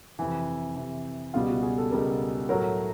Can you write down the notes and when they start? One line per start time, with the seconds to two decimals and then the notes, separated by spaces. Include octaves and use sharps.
0.19 F2 C3 E3
0.76 F2 C3 E3
1.34 C#2 B2 G3 F4
1.48 F#4
1.63 G#4
1.78 A4
1.91 C#2 B2 G3 A#4
2.49 A2 F#3 A3 A#4